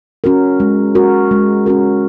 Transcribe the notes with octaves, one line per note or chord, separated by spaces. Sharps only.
C#4 F#4 A#4
G#3
C#4 F#4 A#4
G#3
C#4 F#4 A#4